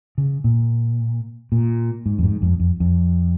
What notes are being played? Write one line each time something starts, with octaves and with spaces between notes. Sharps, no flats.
C#3
A#2
A#2
G#2
F2
G#2
F2
F2
F2